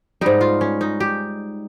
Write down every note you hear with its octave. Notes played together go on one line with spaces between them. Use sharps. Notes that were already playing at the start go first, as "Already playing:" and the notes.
G#2 G3 D#4
F4
C#4
D#4
G4